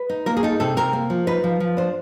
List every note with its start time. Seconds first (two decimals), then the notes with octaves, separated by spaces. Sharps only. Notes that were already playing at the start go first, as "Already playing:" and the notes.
Already playing: B4
0.10 D#4
0.26 A#3 A#4
0.37 G#4
0.43 D#4 A4
0.60 C3 A4
0.77 C3 A#4
0.93 A#3
1.10 F3
1.27 D#4 B4
1.44 F3
1.60 F3
1.77 D4 C5